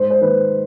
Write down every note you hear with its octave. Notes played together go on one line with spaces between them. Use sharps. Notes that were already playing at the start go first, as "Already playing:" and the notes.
Already playing: G#2 C5
C5
D#3 B4